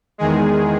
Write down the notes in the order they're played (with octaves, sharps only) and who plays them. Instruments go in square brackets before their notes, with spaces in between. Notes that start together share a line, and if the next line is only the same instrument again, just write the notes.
[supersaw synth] E2 D#3 G#3 G#4